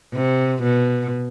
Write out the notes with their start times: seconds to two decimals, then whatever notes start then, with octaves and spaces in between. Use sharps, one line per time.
0.13 C3
0.63 B2